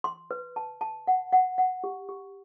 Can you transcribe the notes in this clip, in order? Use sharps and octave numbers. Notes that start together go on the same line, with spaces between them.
C6
B4
A5
A5
F#5
F#5
F#5
G4
G4